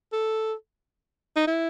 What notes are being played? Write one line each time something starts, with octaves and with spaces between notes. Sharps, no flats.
A4
D#4
E4